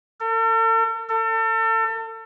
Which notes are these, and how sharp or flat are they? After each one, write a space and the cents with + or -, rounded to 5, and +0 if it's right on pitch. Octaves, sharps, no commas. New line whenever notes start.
A4 +45
A4 +35